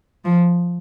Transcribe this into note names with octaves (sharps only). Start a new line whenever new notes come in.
F3